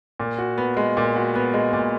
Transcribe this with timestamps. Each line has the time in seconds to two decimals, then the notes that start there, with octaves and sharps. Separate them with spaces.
0.20 A#2
0.38 F#4
0.58 B3
0.77 G#3
0.97 A#2
1.15 F#4
1.35 B3
1.54 G#3
1.73 A#2